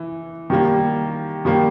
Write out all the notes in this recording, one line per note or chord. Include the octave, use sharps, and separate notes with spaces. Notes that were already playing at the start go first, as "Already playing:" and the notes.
Already playing: E3
D#3 G3 A#3
D#3 G3 A#3